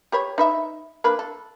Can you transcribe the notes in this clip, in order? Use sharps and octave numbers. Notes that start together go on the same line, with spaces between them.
G4 B4 C#5
D#4 B4 E5
A#3 D4 B4
A4